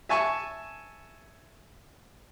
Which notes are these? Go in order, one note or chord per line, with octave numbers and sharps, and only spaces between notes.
E5 G#5 A5 C#6